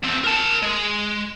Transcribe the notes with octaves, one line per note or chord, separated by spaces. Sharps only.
E2 C4
A#4 A5
G#3